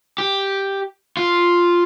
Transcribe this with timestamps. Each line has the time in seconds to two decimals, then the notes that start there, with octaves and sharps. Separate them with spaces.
0.18 G4
1.17 F4